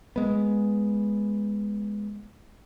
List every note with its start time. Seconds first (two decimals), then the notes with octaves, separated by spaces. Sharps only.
0.16 G#3 B3